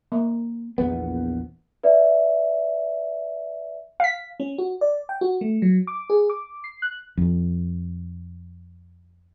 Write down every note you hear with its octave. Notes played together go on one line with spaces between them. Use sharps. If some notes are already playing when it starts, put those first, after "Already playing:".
A#3
A#1 E2 B3
B4 D5 E5
F5 B6
C#4
F#4
D5
G5
F#4
A3
F#3
D6
G#4
D6
C7
F#6
F2 F3